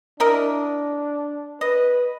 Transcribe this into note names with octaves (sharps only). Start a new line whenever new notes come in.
D4 E4 A#4 D#5
B4 D#5